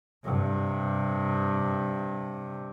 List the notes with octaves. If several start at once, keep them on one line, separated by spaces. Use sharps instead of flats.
G2 C3